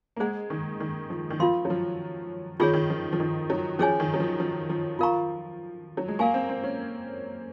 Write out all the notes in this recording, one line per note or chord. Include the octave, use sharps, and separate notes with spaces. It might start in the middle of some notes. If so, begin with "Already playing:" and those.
A#3
G#3 G#4 C5 F#5 A#5
D#3
D#3
F3
D#3
F3 F4 A#4 F5 C6
F#3
F3
D#3 F4 G#4 C#5
D#3
F3
F3
D#3
F#3
F3 C#4 G#4 C#5 G#5
D#3
F#3
F3
F3
F3
F4 A#4 F5 A#5 C#6
F#3
G#3
A#3 A#4 F5 G#5 C#6
C4
C4
C#4